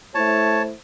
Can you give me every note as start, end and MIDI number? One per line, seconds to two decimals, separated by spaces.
0.15 0.73 57
0.15 0.73 64
0.15 0.73 72
0.15 0.63 73
0.15 0.63 81